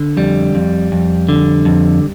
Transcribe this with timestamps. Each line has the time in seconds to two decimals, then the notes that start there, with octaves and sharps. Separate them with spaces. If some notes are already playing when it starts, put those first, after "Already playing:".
Already playing: D3
0.17 F2 G3
0.55 F2
0.92 F2
1.29 D3
1.65 F2